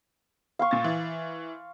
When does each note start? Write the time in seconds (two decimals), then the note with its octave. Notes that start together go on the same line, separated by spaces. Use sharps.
0.59 F5 C6 C#6
0.71 A#2 A6
0.84 E3